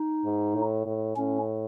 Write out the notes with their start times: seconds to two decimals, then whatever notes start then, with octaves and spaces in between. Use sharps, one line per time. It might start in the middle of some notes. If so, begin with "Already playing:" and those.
Already playing: D#4
0.25 G#2
0.55 A2
0.86 A2
1.17 A2 C#4